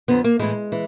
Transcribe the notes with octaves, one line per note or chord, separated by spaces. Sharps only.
F2 D3 B3
A#3
A2 E3 G#3
E3